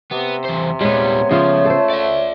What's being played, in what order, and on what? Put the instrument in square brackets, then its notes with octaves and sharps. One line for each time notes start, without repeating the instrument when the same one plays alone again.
[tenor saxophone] C3 [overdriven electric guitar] B3
[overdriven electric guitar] E2 C5
[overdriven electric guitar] A#2 G3 [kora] G#3 B3 [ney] C#5
[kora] C#3 F4 [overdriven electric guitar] F3 [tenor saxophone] A3
[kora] A4 C5
[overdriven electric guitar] D5 E5